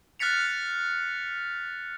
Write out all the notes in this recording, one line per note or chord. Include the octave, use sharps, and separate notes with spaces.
F6 F#6 A6 B6 C#7 F7